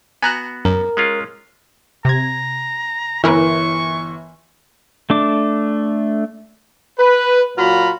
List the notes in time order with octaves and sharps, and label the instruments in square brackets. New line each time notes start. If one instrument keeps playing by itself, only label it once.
[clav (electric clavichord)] B3 F#4 [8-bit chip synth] G#5 A#5 F#6
[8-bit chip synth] F#2 [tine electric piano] A#4
[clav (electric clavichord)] G#3 C#4 F4
[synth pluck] C3 G#6 [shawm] A#5
[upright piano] G1 E3 [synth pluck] E4 A#4 B4 [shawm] C#6
[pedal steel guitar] A3 D4 D6
[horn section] B4
A#2 F#3 F4 F#4 A#5 B5